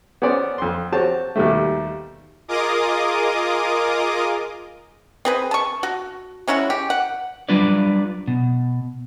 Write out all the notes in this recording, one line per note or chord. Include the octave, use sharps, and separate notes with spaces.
B3 C#4 C5 D5
F2 C6
C4 F#4 G4 C#5 A5
D#2 B2 G3 A3
F4 G#4 A#4 D#5 D6 D#6
C4 G#4 B4
A5 C#6
F#4
G#3 C#4 E4 F#4
G4
F#5
F#3 G3 D4 F4 B4 D5
B2